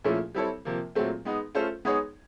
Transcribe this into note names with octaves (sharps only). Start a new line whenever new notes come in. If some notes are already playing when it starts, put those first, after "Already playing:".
A#2 F3 A3 C#4 E4
G3 C4 E4 A4 C#5
C3 F3 A#3
A#2 F#3 A3 C4
G#3 B3 D#4
A3 C#4 F4 A4 C5
G#3 B3 D#4 G#4 C#5